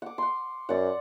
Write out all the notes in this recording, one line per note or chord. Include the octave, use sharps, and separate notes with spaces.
F#5 D6
F#5 C6
F#2 D5 F#5